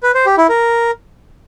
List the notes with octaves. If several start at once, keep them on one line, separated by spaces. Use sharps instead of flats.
B4
C5
G4
E4
A#4